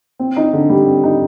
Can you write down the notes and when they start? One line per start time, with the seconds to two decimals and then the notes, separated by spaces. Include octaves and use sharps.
0.19 C4
0.37 D#4
0.53 D3
0.70 G3
0.86 C4
1.04 D#4